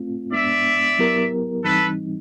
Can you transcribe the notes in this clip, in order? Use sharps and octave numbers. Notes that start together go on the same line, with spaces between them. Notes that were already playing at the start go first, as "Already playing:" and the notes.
Already playing: A3 C4 F4
G#3 B3 D4 D5 E5
F#3 B3 E4 G4 A#4
E3 G3 C4 D#4 A4 B4